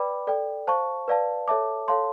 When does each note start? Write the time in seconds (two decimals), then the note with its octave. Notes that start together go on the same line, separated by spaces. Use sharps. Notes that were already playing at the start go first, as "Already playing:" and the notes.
Already playing: B4 D5 G5 B5 D6
0.27 A4 D5 G5
0.67 C5 F5 A5 C#6
1.08 B4 D5 F5 A5
1.48 A4 C#5 E5 A5 D6
1.88 A4 C#5 F5 A5 C6